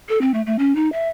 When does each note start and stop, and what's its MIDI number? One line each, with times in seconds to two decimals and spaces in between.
0.09 0.20 69
0.21 0.31 60
0.34 0.41 57
0.46 0.56 57
0.59 0.75 61
0.75 0.91 63
0.92 1.08 76